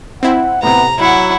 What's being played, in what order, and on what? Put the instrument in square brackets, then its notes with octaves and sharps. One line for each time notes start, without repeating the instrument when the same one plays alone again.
[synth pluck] C4 E4 [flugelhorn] F#5
[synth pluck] A2 C3 [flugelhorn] B3 [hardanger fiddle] A#5
[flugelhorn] F#3 [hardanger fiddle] E4 F#5